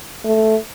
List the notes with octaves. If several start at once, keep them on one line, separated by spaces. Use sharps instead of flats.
A3